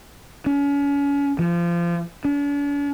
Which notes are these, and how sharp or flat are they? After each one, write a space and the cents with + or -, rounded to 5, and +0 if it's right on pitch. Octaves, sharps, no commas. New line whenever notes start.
C#4 +35
F3 -25
D4 -45